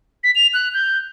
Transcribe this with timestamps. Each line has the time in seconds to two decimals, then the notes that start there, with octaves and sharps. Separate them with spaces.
0.24 B6
0.35 F7
0.54 F#6
0.74 G6